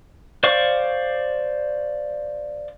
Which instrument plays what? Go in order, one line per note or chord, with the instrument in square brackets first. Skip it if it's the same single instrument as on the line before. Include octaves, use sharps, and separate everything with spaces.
[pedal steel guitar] C5 D5 F5 C#6